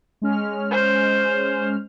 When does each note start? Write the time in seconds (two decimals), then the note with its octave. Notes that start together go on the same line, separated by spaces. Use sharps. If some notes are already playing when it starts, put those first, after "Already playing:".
0.22 G#3 C#4 F6
0.71 C5